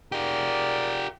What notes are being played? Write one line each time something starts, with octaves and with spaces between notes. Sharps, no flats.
F4 G4 G#4 A#4 D5